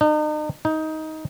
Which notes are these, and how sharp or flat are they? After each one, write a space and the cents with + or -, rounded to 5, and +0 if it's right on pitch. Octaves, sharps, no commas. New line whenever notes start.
D#4 -40
D#4 +15